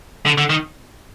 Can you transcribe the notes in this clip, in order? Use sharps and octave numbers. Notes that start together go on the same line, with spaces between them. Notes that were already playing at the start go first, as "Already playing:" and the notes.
D3
D3
D#3